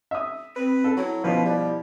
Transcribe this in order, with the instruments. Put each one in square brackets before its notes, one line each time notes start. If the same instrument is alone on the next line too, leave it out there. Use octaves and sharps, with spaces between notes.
[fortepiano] E5 D#6
[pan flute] C4 [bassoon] B4
[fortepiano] A4
[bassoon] F#3 [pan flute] E4
[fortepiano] B2 F3 [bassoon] B4
[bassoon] G3